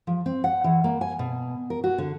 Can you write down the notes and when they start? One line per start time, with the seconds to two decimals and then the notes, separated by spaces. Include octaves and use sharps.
0.07 F3
0.26 C4
0.44 F#5
0.64 E3
0.84 A#3
1.01 G#5
1.19 B2
1.70 A#4
1.84 F#4
1.98 D3